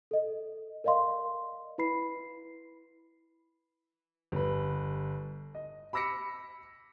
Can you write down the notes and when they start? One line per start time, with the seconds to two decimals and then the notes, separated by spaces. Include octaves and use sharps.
0.11 A4 D#5
0.84 A#4 D5 D#5 F5 C6
1.78 E4 B4 B5 C7
4.32 G1 B4
5.55 D#5
5.93 B5 D6 E6 A#6 B6 C#7